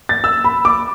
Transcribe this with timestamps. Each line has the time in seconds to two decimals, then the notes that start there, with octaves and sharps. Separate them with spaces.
0.09 A6
0.24 E6
0.44 B5
0.65 D6